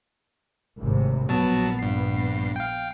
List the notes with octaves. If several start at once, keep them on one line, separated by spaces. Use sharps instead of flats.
G#1 A2 C3
A#1 B2 F#3 B3 A5
G2 C7
F5 G5